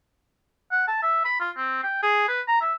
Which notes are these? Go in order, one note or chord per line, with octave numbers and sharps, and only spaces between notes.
F#5
A5
E5
B5
F4
C4
G5
G#4
B4
A#5
E5